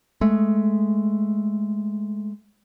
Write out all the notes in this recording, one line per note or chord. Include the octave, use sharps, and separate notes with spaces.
G#3 A3